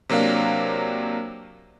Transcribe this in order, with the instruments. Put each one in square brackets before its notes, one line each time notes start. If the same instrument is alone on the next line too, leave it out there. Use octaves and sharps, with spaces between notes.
[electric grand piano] C3 F#3 A#3 D4 F5